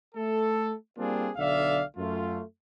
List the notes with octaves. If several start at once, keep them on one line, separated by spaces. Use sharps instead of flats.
A3 A4
G3 A#3 C4 D4 F4 G#4
B1 D3 D5 E5 F5
F#2 A3 F4